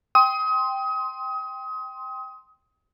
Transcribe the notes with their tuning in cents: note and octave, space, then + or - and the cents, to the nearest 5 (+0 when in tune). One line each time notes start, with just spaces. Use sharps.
G5 +0 C6 +0 D#6 +30